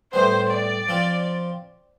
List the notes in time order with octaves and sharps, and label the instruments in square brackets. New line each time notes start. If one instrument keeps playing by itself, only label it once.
[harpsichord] A2 G3 B3 [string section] C5
[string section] D5
[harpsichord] F3 C4 F4